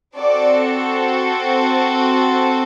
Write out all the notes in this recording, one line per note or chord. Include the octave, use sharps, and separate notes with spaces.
C4 F#4 A4 D5